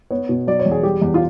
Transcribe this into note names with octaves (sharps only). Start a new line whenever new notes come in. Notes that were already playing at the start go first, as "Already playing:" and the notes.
B3 C#5
B2
F#3 D5
C#5
E2
G#4
G3 G4
E2
F4